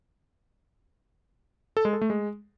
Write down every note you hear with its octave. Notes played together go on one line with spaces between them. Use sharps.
A4
G#3
A4
A3
G#3